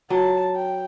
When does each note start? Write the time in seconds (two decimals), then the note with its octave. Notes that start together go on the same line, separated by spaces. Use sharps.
0.10 F#3 A5
0.56 G5